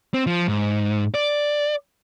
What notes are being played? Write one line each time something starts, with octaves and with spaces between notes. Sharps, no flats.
C4
F3
G#2
D5